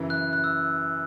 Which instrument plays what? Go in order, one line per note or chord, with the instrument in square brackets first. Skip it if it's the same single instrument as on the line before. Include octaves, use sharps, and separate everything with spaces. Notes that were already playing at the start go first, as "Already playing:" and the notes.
Already playing: [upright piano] F#2 C#3 E3
[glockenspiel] F#6
F#6
E6